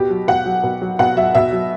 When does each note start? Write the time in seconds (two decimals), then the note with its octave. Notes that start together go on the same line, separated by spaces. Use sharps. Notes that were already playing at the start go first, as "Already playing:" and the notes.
Already playing: B2 G4
0.10 F#3
0.28 B2 F#5
0.46 F#3
0.63 B2
0.82 F#3
0.99 B2 F#5
1.17 F#3 E5
1.35 B2 E5
1.53 F#3